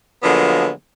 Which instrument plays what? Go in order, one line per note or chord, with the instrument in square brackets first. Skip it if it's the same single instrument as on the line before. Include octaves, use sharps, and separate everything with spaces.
[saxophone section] D3 F3 F#3 G#3 A#3 B3